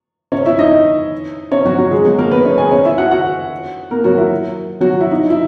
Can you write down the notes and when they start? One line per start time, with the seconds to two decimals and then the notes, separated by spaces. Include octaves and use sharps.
0.32 C#4 C#5
0.46 E4 E5
0.59 D#4 D#5
1.51 C#4 C#5
1.65 F#3 F#4
1.78 F#3 F#4
1.91 G#3 G#4
2.05 F#3 F#4
2.18 A#3 A#4
2.31 B3 B4
2.45 C#4 C#5
2.58 G#4 G#5
2.71 C#4 C#5
2.85 E4 E5
2.98 F#4 F#5
3.11 F#4 F#5
3.91 A#3 A#4
4.04 F#3 F#4
4.18 E4
4.81 F#3 F#4
5.01 E4
5.11 D#4
5.30 E4